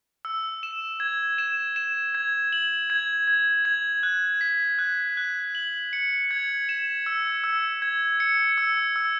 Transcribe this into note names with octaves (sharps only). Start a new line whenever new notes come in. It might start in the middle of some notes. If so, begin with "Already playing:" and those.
E6
E7
G#6
E7
E7
G#6
F#7
G#6
G#6
G#6
F#6
B6
F#6
F#6
F#7
C#7
G#6
E7
E6
E6
G#6
C#7
E6
E6